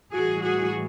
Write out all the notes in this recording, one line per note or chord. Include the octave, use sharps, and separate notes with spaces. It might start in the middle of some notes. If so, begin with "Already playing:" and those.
A2 E3 G3 F#4 G#4
F#4 G#4